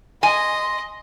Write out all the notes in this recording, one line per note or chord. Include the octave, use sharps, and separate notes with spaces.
D#5 G#5 C6